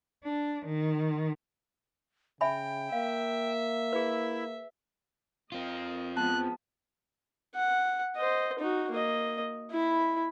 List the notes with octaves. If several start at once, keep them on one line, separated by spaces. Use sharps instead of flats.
D4
D#3
C#3 E5 G5 G#5 B5
A#3 E5 F5
E4 G#4 B4
C4 F4 A#4 D#5
F3 G#3 B3 A5 F#6
F#5
C5 D#5
D#4 F#4
A#3 D#5
E4 B5